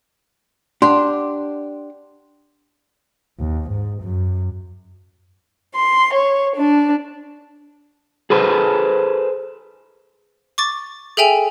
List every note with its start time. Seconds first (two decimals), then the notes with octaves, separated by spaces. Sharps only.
0.82 D4 G4 F#5 C6
3.39 D#2
3.70 G#2
4.03 F#2
5.76 C6
6.14 C#5
6.57 D4
8.30 G#4 A4 B4 C5
10.58 C#6 D6 A6
11.17 G#4 A4 E5 G5 G#5 F7